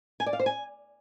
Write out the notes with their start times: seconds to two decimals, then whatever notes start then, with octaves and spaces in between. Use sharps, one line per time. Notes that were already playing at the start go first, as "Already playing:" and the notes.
0.20 G#5
0.26 D5
0.33 F5
0.39 C5
0.46 G#5